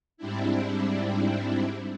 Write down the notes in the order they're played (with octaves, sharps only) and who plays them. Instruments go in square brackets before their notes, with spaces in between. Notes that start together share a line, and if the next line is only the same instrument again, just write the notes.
[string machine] G#2 G3 C4 D4 E4